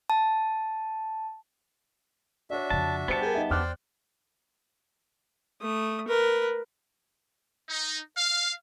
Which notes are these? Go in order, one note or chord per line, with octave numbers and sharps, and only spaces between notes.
A5
D4 F#4 C#5 D5 E5
F2 C#3 A5
G3 B3 G4 C5 A5 C#7
G#4 A#4 G5 G#5
D#4 E5
E2 C5 D5 G5 D6 F6 F#6
A3 D#6
A#4 B4
D#4
F5